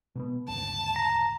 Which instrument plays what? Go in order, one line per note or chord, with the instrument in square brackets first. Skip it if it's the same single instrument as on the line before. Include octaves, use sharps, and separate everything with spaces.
[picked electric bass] B2 A#3 B3
[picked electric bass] D1 G1 C#2 [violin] A5
[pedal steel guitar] A#5